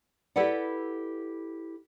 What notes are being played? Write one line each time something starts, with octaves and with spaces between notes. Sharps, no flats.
E4 G4 A4 B4 D5 F#5